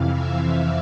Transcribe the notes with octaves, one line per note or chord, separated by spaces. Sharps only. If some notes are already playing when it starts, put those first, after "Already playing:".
Already playing: F2 C3 E3 F5
E5